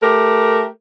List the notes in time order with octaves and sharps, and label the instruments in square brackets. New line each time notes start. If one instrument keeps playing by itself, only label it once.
[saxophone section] A3 G4 A#4